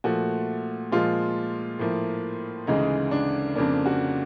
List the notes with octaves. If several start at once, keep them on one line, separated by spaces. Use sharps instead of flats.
A#2 F3 A3 F#4
A#2 F3 G#3 F4
A2 F3 A#3
D2 C#3 E3 G#3 D#4
D4
F2 C#3 F3 A#3 D4
F#4